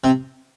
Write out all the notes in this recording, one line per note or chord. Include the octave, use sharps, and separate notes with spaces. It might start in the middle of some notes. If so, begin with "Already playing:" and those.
C3